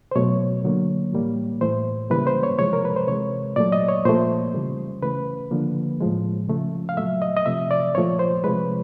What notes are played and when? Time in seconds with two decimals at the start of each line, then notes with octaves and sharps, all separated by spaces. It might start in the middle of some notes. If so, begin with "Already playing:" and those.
0.11 C5
0.16 B2 F#3 A3 C#5
0.64 D3 F#3 A#3
1.13 A2 E3 G3 A#3
1.61 A2 E3 A3 C5
2.10 C#3 E3 G3 A#3 B4
2.27 C5
2.43 C#5
2.59 C3 F3 G#3 C#5
2.73 A#4
2.85 B4
2.96 C5
3.07 C3 E3 G#3 C#5
3.56 A#2 F#3 A3 D5
3.72 D#5
3.88 C#5
4.05 A#2 F3 A3 C5
4.54 C#3 E3 G3
5.02 C#3 E3 A3 B4
5.51 D3 F3 A#3
6.00 A2 F3 G#3
6.48 C#3 F3 A3
6.89 F5
6.97 A#2 F#3 A3 E5
7.22 D#5
7.37 D#5
7.46 C3 F3 A3 E5
7.71 D5
7.95 A#2 F3 A3 C#5
8.19 C5
8.44 C3 F3 G#3 B4